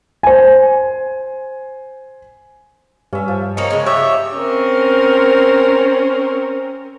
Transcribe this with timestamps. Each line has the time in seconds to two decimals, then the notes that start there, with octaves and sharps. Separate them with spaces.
0.23 C5 G#5
3.13 G2 C#4 E5
3.28 F3
3.57 A#3 C4 D#4 C#5
3.71 C#3 G#3
3.86 G4 C#5 D5 E5
4.35 C4 C#4 A#4